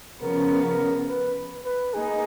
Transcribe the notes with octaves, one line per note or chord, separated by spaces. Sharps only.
C#3 F3 B3 A#4
B4
B4
A#3 D#4 G#4